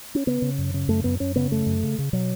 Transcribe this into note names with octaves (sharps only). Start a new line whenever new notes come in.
C#4
C#3 B3
C#3
F#2
C#3
F#2 A3
F#2 B3
F#2 C#4
C#3 B3
F#2 A3
F#2
C#3
C#3
B2 F#3